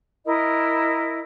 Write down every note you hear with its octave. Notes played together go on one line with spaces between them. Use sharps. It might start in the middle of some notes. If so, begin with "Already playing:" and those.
E4 A#4 D#5